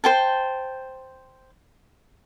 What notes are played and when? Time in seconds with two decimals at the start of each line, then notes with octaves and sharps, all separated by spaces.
0.04 C5 G5 A5